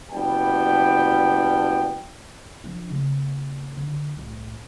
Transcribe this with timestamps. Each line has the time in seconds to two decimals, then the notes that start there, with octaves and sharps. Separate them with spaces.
0.10 F#1 G3 B3 G5 A5
2.64 F3 D4
2.90 C#3 A#3
3.77 D3
4.16 C2 A2